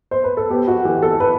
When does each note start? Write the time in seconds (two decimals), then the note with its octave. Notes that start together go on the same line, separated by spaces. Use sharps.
0.11 C5
0.24 B4
0.37 A4
0.50 B3 G4
0.68 F#4
0.85 E3 G4
1.03 A4
1.20 B4